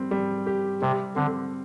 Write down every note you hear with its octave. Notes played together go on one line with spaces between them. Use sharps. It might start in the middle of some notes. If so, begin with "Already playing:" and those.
Already playing: G3 C4
G3
G4
C3 G3
D3 C4